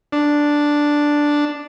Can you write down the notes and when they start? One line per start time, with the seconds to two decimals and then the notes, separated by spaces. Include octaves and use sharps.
0.12 D4